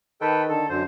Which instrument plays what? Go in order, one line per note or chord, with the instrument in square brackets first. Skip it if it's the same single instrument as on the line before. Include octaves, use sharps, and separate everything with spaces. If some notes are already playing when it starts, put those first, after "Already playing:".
[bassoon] D#3 [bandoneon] A4 B4 G5
[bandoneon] D3 A4
F#2 D3 C5